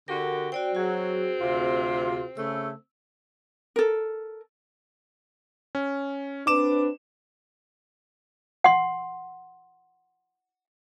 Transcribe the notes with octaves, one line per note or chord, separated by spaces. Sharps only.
D3 F#4 G4 A#4
C4 F#4 D5 G5
F#3 F#4 G#4
D2 C3 F4
C#3 A3 E6
A4 A#4
C#4
C4 D4 B4 D6 E7
F#5 C6